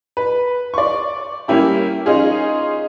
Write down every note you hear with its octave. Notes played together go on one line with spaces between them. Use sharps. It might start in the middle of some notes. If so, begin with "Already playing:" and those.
B4
D5 C#6
G3 A#3 C#4 E4 G4
C#4 D#4 F4 G#4